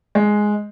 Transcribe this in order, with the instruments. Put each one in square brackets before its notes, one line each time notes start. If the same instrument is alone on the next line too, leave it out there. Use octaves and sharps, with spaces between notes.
[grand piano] G#3